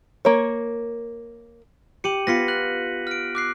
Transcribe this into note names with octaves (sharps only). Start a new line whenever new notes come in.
A#3 C#5
G4 C#7 D#7 F#7
B3 F4 A#6 B6 C#7
F#6 F#7
F6 D7
D6 F#6 C7